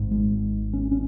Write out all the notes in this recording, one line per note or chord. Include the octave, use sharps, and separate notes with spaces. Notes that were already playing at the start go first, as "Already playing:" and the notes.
Already playing: G#1 G#2
G#3
C#4
C#4